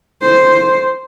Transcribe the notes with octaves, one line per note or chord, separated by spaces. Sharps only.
C5